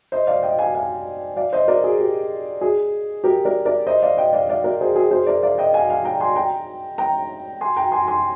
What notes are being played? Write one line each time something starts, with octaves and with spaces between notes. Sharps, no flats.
C5 D#5
D5 F5
D#5 G5
F5 G#5
F5 G#5
D5 F5
C5 D#5
A#4 D5
G#4
G4
G#4
G4 A#4
A#4 D5
A#4 D5
C5 D#5
D5 F5
D#5 G5
D5 F5
D5 F5
A#4 D5
G#4 C5
G#4
G#4 C5
A#4 D5
D5 F5
D#5 G5
F5 G#5
F5 G#5
G5 A#5
G#5 C6
G5 A#5
G5 A#5
G#5 C6
G5 A#5
G#5 C6
G#5 C6